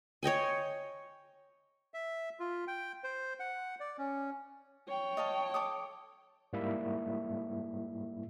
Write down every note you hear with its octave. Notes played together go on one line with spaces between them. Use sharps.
C#5 D#5 G5 G#5
E5
F4
G5
C5
F#5
D5
C#4
C#5 G5
D#5 F5 A5
A4 D6 D#6
G#2 G3 A#3 E4 E5